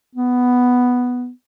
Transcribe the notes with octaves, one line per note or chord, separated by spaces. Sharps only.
B3